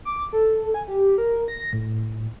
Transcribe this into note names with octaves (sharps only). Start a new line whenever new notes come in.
D6
A4
G#5
G4
A#4
A#6
A2